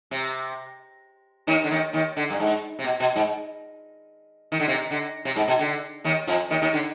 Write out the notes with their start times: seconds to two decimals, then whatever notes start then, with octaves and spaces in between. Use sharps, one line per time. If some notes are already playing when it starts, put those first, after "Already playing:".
0.11 C3
1.47 D#2 D#3
1.64 D3
1.71 D#2 D#3
1.93 D#2 D#3
2.17 D3
2.30 G2
2.39 G#2
2.79 C3
2.84 B2
3.00 B2
3.16 G#2
4.52 D#3
4.59 D3
4.68 C3
4.91 D3
5.25 C3
5.36 G#2
5.48 B2
5.59 D3
6.04 D#2 D#3
6.27 F2 F3
6.51 D#2 D#3
6.62 D#2 D#3
6.73 D3